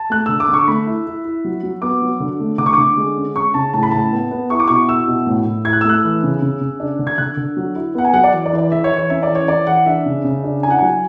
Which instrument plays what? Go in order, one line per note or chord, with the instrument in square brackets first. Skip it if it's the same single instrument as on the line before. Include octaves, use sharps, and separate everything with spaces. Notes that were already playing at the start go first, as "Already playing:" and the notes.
Already playing: [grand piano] A5
A3 F#6
D3 E6
D6
D3 C#6
A3 B5
E4
E4
E4
F#3
F#3
B3 D6
F#3
D3
A3
D3 D6
C#6
D3 D6
G#3
C#4
C#4 C#6
C#3 A5
A2 A5
B5
A2 A5
B3
B3
E4 C#6
D6
B2 C#6
E4 E6
B2
A2
A2
E4 G#6
F#6
E6
A3 F#6
E3
C#3
C#3
C#3
D4
D3
G#6
D3 F#6
D3
F#3
E4
B3 F#5
G#5
F#3 F#5
D5
E3
D5
E3
D5
E3 E5
C#5
E3
C#5
C#4 E5
D5
E3
C#5
E3 D5
E3 F#5
D4 E5
C#3
C#3
D4
E4 G#5
F#5
F#3 G#5